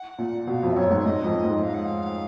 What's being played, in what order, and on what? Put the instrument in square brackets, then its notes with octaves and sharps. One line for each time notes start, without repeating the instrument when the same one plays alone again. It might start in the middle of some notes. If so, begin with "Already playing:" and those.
Already playing: [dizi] F#5
[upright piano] A#2
[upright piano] B2 [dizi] F5
[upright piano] F2
[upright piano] F#2 [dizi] C#5
[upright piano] G#2
[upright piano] G#2 [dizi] D#5
[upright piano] F2
G#2
[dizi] F5
F#5
F5